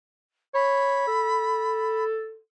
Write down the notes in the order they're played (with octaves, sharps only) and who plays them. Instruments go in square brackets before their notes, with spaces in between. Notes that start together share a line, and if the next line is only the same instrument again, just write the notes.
[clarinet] C#5 [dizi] B5
[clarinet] A4